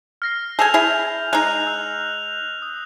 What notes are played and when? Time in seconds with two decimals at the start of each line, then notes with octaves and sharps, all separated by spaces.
0.22 F6 A#6 C7
0.59 G#4 A4 G#5 G6 A#6 F7
0.74 E4 G#4
1.33 G#3 D#4 F#6 F7
1.67 E6
2.62 D#6